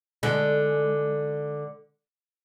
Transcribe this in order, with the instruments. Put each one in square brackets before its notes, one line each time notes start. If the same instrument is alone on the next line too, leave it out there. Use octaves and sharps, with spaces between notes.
[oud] D3 G#3